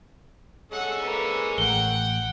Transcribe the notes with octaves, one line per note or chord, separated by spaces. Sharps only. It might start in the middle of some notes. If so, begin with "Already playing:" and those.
G#3 C#4 A4 F#5
A#3 B4
A1 F#5 G5 G7